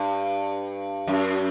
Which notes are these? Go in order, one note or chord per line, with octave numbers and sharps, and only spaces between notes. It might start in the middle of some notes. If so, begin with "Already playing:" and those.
Already playing: G2
F#2